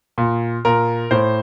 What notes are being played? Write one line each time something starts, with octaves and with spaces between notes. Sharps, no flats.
A#2
A#2 A#4
A2 C5